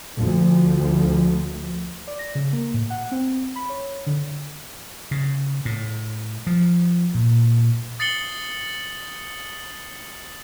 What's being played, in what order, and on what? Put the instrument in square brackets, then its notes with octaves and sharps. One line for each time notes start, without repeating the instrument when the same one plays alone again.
[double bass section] D2 F3
[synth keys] D5
A#6
C#3
A#3
A2
F#5
C4
B5
C#5
D3
[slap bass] C#3
A2
F3
A#2
[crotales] D#6 A6 C7 C#7 F#7 G7